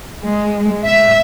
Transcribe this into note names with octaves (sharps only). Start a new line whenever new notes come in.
G#3
E5